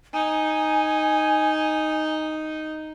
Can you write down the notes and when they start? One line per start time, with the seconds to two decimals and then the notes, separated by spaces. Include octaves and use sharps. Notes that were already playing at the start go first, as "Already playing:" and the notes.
0.13 D#4 G#5